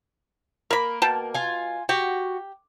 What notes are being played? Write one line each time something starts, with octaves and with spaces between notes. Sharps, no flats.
A#3 A#4 B5
B2 G5 A5
F4 G#5
F#4 G4